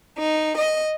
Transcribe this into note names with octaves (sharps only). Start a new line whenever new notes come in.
D#4
D#5